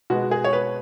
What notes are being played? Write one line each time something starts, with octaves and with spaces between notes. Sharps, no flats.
B2 G#3 B3 F#4
G#4
C#5
B4